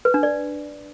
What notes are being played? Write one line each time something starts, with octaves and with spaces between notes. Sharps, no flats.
B4
D4
D5